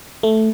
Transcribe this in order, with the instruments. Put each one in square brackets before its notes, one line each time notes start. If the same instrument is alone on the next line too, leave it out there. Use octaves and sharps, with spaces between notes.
[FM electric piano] A3